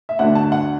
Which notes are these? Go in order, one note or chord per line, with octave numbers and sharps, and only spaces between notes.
E5
D2 D3 F#5
A5
F#5